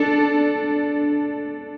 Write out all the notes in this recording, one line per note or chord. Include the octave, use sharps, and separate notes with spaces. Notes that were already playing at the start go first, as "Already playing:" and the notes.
Already playing: D4 A4